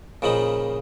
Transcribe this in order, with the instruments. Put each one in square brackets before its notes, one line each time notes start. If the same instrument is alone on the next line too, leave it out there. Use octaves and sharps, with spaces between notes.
[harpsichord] A#2 C#3 F3 D#4 B5